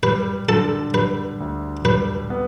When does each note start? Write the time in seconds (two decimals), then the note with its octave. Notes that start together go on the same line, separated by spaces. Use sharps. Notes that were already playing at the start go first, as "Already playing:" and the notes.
0.03 G3 B4
0.49 D3 A4
0.94 G3 B4
1.40 D2
1.85 G3 B4
2.30 B3